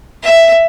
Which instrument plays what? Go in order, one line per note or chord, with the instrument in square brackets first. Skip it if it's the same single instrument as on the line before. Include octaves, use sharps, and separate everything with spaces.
[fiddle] E5